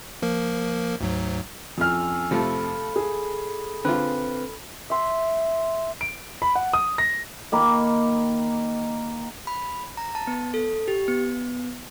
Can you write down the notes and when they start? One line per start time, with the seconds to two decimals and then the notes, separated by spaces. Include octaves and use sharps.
0.22 F3 A#3 A#4
1.01 D2 G#2 F#3
1.78 F2 C#4 G#5 E6 F6
2.31 C3 F3 A3 A4 B5
2.96 G#4
3.85 D3 C4 F4 B4
4.90 E5 C6
6.01 D7
6.42 B5
6.55 F#5
6.73 D#6
6.98 A#6
7.52 D#3 A#3 B5 D6
9.47 B5
9.97 A#5
10.15 A5
10.27 B3
10.54 A4
10.88 G4
11.08 B3